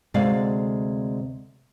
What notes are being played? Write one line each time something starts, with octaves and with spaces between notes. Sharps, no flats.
D2 C3 G#3 D5 F5